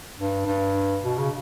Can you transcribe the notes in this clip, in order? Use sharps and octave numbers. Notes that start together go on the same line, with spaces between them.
G2
G2
B2
C#3